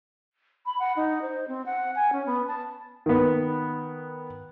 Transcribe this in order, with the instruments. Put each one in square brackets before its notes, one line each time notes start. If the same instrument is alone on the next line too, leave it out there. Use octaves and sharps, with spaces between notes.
[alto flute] B5
F#5
D#4
C5
C4
F#5
G#5
C#4
B3
A5
[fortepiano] D#3 B3